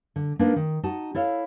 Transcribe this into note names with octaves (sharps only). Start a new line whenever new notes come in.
D3
A#3 D4 D#4 A#4 B4
D#3
D#4 F#4 A5
E4 A4 C#5 F5